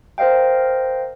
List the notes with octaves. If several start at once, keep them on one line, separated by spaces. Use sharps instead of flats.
A#4 C5 D#5 F5 G5